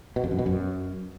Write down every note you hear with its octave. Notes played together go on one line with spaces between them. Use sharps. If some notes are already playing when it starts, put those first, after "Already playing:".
B2
F2
F#2
B2
F#2